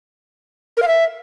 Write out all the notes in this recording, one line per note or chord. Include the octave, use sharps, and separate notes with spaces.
A#4
F5
E5